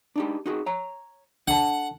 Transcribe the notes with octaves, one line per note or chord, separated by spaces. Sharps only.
D4 D#4 G4
D#4 F#4 G#4
C#5 A#5
D4 A4 F#5 A5